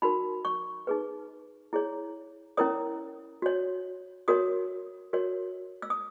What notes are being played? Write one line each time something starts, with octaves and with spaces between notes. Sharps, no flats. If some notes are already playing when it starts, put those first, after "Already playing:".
D#4 F#4 A#4 B5
C#6
D#4 G#4 B4
E4 G#4 C#5
C#4 E4 A#4 C#5 D#6
F#4 C#5
F#4 A#4 C#5 D#6
F#4 A#4 C#5
E6
D#6